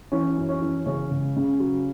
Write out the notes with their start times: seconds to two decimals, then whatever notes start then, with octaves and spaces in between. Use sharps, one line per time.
0.12 E3 C#4
0.37 F#2
0.49 C#4
0.62 E3
0.86 C#3 C#4
1.11 C#2
1.36 C#3
1.60 F#3